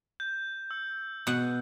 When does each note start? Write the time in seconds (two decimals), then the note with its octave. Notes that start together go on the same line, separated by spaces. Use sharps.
0.20 G6
0.71 E6
1.27 B2 F#5